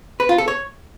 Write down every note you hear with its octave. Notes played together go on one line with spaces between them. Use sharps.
B4
F4
A4
C#5